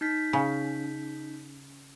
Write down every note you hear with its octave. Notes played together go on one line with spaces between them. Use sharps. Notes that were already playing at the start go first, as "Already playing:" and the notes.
D#4 G6 B6
C#3